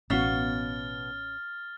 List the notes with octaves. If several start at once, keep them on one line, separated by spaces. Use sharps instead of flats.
A1 B2 B3 C#4 F#4 F5 F6 A6